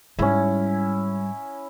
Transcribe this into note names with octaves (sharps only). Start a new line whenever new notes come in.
G#2 G3 C#4 E4